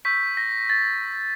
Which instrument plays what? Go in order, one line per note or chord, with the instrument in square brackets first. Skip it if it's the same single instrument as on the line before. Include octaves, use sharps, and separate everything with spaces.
[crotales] C#6 E6 G6 B6
A#6
A6